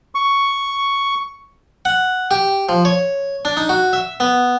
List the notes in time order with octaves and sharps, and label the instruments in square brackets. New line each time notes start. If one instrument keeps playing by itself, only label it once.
[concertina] C#6
[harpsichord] F#5
G4
F3
C#5
D4
D#4
F#4
E5
B3